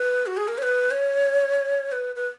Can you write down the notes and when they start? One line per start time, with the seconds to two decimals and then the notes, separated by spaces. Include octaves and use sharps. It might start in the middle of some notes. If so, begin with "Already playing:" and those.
Already playing: B4
0.27 F#4
0.37 G#4
0.48 A#4
0.58 C#5
0.63 B4
0.91 C#5
1.92 B4
2.16 B4